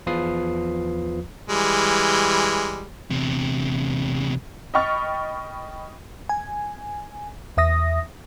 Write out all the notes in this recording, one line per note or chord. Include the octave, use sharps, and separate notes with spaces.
E2 F3 F4 B4 D#6 C7
E3 G3 G#3
E2 C3
D#5 G5 B5 C#6 F6 A6
G#5
E2 E5 D#6 A#6